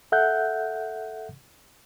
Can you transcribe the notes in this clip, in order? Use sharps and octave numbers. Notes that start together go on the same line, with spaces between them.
A4 E5 F#5 F#6 G6